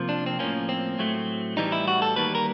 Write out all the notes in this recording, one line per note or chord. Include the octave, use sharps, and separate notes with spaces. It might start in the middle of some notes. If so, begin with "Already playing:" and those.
Already playing: C3 F3 A#3
D4
C4
A2 F3 A#3 C#4
C4
A2 F#3 A3
A2 E3 G3 D#4
E4
F#4
A4
D#3 G3 A#3 B4
A#4